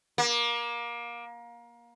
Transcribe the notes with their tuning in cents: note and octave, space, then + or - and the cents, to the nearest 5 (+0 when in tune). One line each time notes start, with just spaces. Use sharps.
A#3 +25